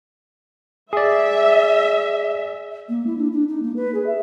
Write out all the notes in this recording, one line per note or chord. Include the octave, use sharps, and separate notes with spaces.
G#4 D5 E5
A#3
E4
D4
D4
D#4
A#3
B4
G#4
E5